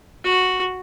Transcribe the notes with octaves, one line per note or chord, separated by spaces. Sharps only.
F#4